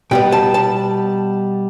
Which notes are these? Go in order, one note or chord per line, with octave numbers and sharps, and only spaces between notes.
B2 G3 B3 G5
A5
A5